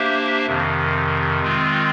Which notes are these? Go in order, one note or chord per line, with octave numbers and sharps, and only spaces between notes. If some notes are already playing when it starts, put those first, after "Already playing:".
Already playing: A#3 D4 G4 C5 E5
F2 C3 D#3
D#3 G#3 C4 F4